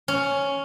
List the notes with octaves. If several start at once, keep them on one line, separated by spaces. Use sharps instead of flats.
C#4